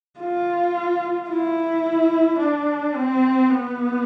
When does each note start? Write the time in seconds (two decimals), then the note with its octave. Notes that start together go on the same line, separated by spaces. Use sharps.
0.20 F4
1.29 E4
2.40 D4
2.95 C4
3.49 B3